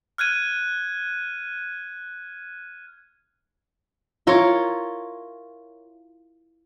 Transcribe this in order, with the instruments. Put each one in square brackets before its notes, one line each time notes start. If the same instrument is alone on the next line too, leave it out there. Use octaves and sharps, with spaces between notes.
[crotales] F6 F#6 G#6 D#7
[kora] E4 F4 A#4 C#5